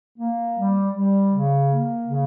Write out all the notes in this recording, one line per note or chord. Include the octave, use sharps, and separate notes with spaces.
A#3
G3
G3
C#3
A#3
C#3